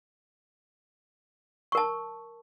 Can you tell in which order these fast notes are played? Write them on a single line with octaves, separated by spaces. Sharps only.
C#6 A#4 A5